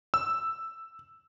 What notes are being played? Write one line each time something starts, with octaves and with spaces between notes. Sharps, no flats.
E6